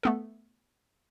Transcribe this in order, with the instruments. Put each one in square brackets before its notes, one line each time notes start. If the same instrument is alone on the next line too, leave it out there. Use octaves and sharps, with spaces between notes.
[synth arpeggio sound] A3 B3 A4